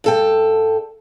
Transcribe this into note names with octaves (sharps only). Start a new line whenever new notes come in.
G2 A4 G5